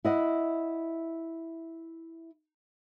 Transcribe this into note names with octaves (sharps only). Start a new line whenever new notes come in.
E4 D#5 F#5